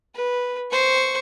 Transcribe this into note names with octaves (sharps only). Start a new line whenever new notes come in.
B4
C5 C#6